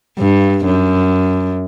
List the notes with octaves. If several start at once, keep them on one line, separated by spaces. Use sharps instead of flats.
G2
F#2